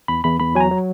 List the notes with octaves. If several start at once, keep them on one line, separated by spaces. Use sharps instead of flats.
E2 B5
E2 B5
E2 B5
F#3 G#5
A#5
F#3